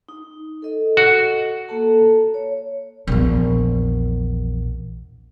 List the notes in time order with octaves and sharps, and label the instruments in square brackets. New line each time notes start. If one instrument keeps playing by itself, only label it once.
[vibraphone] D#4
A4 D#5
[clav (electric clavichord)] F#4
[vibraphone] A#3 A4 A5
C#5
[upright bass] A#1 E2